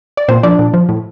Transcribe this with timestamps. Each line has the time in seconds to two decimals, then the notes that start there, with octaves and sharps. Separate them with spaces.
0.17 D5
0.28 A#2 C4 C5
0.43 F3 D4 D5
0.59 A#2
0.74 F3
0.89 A2